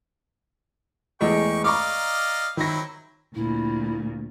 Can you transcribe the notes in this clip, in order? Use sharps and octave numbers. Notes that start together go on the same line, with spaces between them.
E2 G#3 A3 G5 C#6
D5 D#5 F5 A#5 C#6 D6
D#3 F#3 C4 E4 A#6
D2 A#2 E4